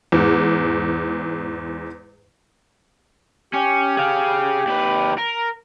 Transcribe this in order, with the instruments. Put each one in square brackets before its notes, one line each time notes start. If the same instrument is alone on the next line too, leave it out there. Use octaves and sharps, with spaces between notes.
[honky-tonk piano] E2 G#2
[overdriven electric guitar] C#4 [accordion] G4
[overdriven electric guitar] G#4 F5
D#2 B4
A#4